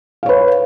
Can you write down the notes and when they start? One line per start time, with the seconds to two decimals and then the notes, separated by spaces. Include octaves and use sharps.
0.23 F5
0.26 C#5
0.29 B4